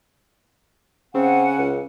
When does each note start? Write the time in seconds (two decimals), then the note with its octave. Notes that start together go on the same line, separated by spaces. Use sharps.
1.15 C#3 C4 F#5 G#5
1.58 C#2